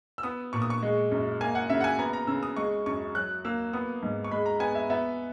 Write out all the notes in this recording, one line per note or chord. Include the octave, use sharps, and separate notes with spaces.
E6
B3 D#6
A#2 C#6
D#6
C#6
G#3
F#2
A#3 G#5
F#5
C#3 E5
F#5
G#5
B3 A#5
A#5
C#3 E6
D#6
G#3 C#6
F#2 C#6
F#3 F#6
A#3 E6
B3 D#6
G#2
C#6
G#3 B5
A#5
B3 G#5
E5
B3 E5